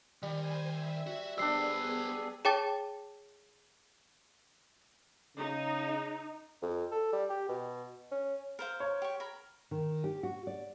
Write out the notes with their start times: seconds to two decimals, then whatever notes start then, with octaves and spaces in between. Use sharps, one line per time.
0.22 D#3 G3 C5 G#5
0.67 E5
1.07 F#4
1.38 G3 B3 D4 G#4 A#4 C5 E6 C7
2.45 G#4 C#5 G5 A5 D6 A6
5.37 C#3 D#4
6.62 F2
6.91 A4
7.13 G3
7.30 G4
7.49 B2
8.12 C#4
8.59 A#4 C5 F5
8.80 C#5
9.02 G4 C#6
9.20 A#4 B5
9.71 D#3
10.04 G4
10.23 F#4
10.47 D5